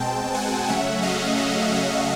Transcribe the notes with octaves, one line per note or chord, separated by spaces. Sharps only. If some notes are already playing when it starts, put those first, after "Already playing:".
Already playing: B2 G#3 C4 G5 A5
F#5 G#5
C#3 F#3 A3 C#4 E5 F#5
D#5 F5
D#5
E5